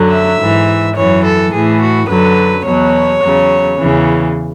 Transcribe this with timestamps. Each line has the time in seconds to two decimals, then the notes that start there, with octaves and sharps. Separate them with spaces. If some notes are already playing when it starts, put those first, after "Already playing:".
Already playing: F#2 D3 F#3
0.10 E5
0.39 G#2 E3
0.95 F#2 E3 C#5
1.24 A4
1.52 A2 E3 G#4
1.80 F#4
2.08 F#2 D3 F#3 B4
2.65 E2 B2 F#3 C#5
3.22 E2 C#3 F#3
3.79 E2 C#3 E3